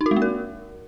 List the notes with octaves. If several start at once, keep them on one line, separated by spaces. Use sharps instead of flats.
D#4
F#4
G#3
A#3
A#4